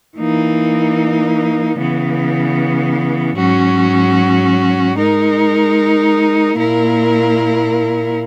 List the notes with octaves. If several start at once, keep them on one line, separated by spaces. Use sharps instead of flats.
E3 A#3 D#4
C#3 E3 B3
G#2 F#3 C#4 F#4
G#3 D#4 A#4
A#2 A#3 E4 A#4